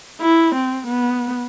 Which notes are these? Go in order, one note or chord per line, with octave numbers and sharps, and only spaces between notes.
E4
C4
B3